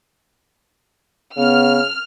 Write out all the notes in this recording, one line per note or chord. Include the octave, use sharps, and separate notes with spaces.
C#3 B3 F6